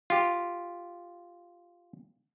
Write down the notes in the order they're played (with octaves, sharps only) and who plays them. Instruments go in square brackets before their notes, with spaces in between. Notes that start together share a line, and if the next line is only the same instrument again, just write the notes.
[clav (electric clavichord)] F4 G4